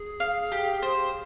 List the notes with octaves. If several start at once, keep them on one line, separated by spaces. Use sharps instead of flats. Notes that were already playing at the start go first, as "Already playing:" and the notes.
Already playing: G#4
F5
G4
C5